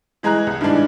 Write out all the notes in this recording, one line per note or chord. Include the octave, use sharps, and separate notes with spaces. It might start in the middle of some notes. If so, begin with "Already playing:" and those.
E3 G#3 G#4 A#5 F#6
C2
G2 D#3 E3 G#3 D4